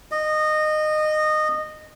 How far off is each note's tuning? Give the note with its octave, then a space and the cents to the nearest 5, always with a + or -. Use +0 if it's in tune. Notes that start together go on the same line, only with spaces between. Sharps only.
D#5 -20